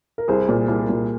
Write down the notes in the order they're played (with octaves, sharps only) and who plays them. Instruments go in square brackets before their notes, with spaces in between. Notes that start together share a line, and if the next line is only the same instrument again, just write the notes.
[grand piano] A#4
[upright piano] C2 [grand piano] G#4 C5
[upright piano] A#2
C2
A#2